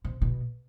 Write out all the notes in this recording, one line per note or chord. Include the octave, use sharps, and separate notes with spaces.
C3
B2